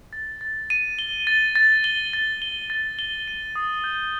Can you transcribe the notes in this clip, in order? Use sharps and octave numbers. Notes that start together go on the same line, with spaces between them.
A6
A6
D#7
G7
A6
A6
G7
A6
G7
A6
G7
D#7
D#6
G6